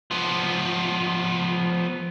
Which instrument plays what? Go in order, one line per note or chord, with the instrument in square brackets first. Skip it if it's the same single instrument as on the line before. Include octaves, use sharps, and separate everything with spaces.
[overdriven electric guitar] F3 B3